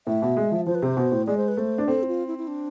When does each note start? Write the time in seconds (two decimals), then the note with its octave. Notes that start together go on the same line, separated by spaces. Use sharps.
0.07 A2 E5
0.22 B2
0.37 G#3
0.51 F3
0.66 F3 C5
0.75 B4
0.82 C3 C5
0.97 B2
1.12 A2
1.27 G#3 D5
1.38 C5
1.48 B4
1.57 A3 C5
1.78 D4
1.87 C4 A4
2.03 E4
2.08 F4
2.27 E4
2.38 E4
2.47 D4